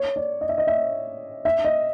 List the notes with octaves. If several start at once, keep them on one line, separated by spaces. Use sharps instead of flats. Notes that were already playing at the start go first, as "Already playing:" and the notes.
Already playing: C#5
D5
D#5
E5
D#5
E5
E5
D#5